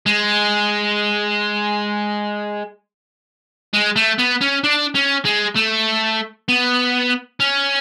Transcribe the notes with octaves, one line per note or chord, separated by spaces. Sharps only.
G#3
G#3
A3
B3
C#4
D4
C#4
G#3
A3
B3
C#4